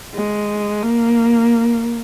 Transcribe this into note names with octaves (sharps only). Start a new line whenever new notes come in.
G#3
A#3